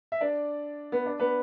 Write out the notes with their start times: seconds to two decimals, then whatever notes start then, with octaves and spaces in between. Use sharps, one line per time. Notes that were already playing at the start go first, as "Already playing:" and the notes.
0.12 E5
0.21 D4 D5
0.92 B3
1.06 D4
1.20 B3 B4